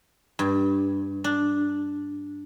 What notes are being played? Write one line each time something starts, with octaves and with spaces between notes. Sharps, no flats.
G2
D4